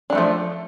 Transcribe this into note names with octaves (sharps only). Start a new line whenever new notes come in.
F3 F#3 A3 D4